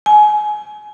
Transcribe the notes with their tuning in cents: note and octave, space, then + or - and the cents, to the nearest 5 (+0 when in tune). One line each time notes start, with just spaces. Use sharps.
G#5 +25